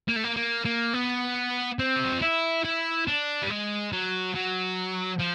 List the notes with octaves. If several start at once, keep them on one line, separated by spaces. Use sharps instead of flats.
A#3
A3
A#3
A#3
A#3
B3
C4
G4
F#4
F4
E4
E4
D4
G3
G#3
F#3
F#3
F3